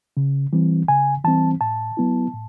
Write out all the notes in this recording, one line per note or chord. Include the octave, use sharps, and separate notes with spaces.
C#3
E3 G3 C4
C#3 G#5
E3 G3 C4 A5
A2 A5
F#3 B3 E4
A2